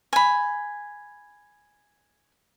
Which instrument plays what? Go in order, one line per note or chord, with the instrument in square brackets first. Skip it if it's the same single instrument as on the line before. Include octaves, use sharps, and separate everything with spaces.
[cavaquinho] G#5 B5